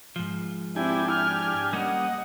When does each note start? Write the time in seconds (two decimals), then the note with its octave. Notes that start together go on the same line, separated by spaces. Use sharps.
0.16 G#2 F3
0.76 C4 D4 E4 G4 G#5
1.11 F6
1.73 G3 A#3 C#4 D#5 F#5